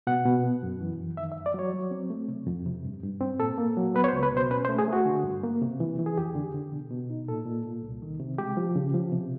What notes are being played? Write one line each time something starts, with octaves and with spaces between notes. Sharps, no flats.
B2 F#5
B2
B3
F#2
E3
F#2
D#3 E5
E5
F#2
D5
F#3 C#5
F#3
C4
A3
C3
F2
C3
G2
G2
C4
A#2 A4
A#3
F#3
B3 B4
C#5
C5
C#2
B4
B2 C5
C#4 B4
C5
A3
G#4
A3 F#4
D3
G2
A#3
C3
E3
E3
G#4
F2 G4
D3
D3
B2
B2
D#4
A#2 A4
A#2
A#2
C2
D#3
C3
G#3 G4
F3
C#3
F3
C3